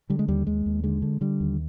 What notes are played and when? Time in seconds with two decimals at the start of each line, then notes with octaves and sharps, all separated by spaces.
0.10 D3 G3
0.19 G#3
0.28 D#2 G3
0.47 D#2 G#3
0.66 D#2
0.83 D3 G#3
1.02 D3
1.21 D3 G3
1.40 D#2